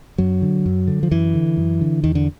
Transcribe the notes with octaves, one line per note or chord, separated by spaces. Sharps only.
F#2 F#3
D3
F#2
D3
F3
F#2 E3
D3
F#2
D3
E2 D#3
D3